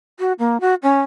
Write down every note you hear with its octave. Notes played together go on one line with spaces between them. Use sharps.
F#4
A#3
F#4
C#4